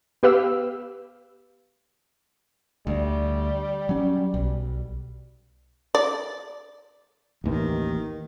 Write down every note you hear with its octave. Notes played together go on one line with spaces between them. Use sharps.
B3 G4 B4 F5 E6
D2 G3
F#3 C#4
B1
D5
A1 D#2 D#3 E3